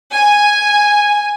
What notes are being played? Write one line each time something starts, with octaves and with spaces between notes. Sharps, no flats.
G#5